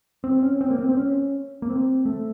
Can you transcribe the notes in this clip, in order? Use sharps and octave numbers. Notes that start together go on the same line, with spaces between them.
C4
C#4
C4
A#3
C4
C4
C#4
A#3
C4
A3